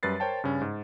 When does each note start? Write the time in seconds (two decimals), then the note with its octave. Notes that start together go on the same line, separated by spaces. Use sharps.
0.03 F#2 G3 B4 A6 C7
0.20 A#4 C5 C#5 G5 A5
0.44 G2 C#3 C#4
0.62 G#2